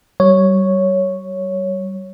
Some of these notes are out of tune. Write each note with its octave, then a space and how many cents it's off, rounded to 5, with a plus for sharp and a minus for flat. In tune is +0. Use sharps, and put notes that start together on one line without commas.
G3 -30 C#5 +0